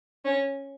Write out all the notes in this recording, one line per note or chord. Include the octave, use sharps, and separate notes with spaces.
C#4